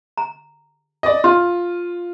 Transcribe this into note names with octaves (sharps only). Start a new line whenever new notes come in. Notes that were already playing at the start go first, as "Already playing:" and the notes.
A#5
D5 D#5
F4 C6